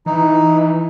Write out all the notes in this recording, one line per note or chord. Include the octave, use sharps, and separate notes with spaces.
E3 D#4